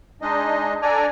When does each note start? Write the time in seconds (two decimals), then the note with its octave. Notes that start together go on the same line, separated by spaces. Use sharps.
0.22 G#3 D4 D#4 D#5
0.82 D4 A4 D5 G#5 A#5